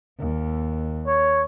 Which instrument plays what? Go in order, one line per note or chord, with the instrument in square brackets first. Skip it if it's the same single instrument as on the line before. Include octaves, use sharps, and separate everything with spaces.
[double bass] D#2
[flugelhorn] C#5